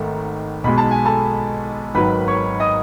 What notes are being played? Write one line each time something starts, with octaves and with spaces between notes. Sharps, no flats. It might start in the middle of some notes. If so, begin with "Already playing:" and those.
Already playing: G#1 G#2 D#3 A3
B1 B2 G#3 B5
A5
G#5
A4 A5
G#1 G#2 D#3 F#3 B4 B5
C#5 C#6
D#5 D#6